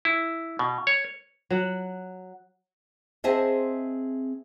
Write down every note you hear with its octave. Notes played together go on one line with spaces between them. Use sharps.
E4
B2
C#5
F#3 F#5
C4 G#4 C5 D#5 E5 A5